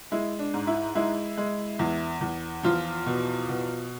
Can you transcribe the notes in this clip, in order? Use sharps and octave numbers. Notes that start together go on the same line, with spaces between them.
G#3 E4
D4
G#2
E4
G#3 E4
G#3
E2
E2
E2 F3 F4
B2
B2